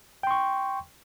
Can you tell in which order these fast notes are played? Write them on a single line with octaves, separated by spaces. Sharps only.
G5 C6 C#6